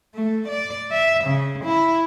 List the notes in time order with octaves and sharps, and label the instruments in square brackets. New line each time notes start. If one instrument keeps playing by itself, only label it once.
[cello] A3
D5
E5
C#3
E4